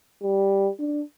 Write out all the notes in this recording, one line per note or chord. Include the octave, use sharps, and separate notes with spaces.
G3
D4